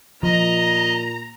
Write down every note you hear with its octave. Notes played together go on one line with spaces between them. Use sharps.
A#2 F3 D#5 A#5